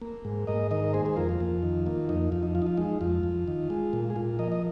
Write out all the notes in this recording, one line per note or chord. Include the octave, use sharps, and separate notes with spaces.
A#3
G#2
G#2 A#4 D#5
D#3 A#4 D#5
A#4
A#3 G#4 C5
G#4 C5
F2 F4 A#4
F4
F2
D#3
A#3 F4
F2 D#4
F2 F4
D#4
F3 F4
D#4
F4
G#3 D#4
F2 F4
F2
D#3
G#3
A#2
G#4
A#2 F4
F3 A#4 D#5
D#5